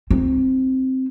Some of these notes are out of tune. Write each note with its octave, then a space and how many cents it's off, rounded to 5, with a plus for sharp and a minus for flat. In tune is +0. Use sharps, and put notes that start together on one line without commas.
C4 +0 D#4 +0